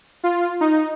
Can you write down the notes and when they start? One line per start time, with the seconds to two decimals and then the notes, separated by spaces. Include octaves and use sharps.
0.24 F4
0.61 D#4